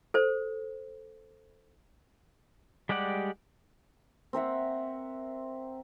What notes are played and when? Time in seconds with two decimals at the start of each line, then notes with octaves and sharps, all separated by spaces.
0.14 A4 C5
2.89 G3 G#3 G4 D5 F#5
4.33 C4 A#4 E5 F#5